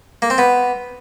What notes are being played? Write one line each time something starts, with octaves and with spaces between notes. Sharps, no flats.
A#3
C4
B3